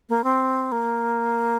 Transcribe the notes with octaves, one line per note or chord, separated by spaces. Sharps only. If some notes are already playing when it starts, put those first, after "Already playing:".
A#3
C4
A#3